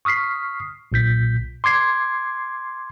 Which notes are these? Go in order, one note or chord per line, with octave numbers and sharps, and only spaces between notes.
C#6 D#6 F6 B6 C7
B1 A#2 G6 B6
C6 D6 G#6 C7